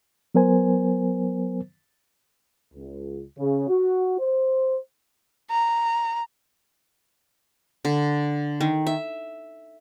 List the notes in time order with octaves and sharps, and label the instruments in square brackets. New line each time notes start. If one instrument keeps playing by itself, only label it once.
[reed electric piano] F#3 B3 A#4 C5 G#5
[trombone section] C#2
C#3
F#4
C5
[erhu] A#5
[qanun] D3
D#3
E5